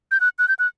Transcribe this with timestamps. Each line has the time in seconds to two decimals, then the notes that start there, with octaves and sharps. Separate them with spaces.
0.11 G6
0.21 F#6
0.39 F#6
0.48 G6
0.59 F#6